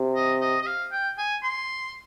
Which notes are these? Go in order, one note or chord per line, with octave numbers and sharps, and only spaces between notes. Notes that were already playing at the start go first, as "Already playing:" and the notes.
Already playing: C3
D#5
D#5
D#5
F5
G5
G#5
C6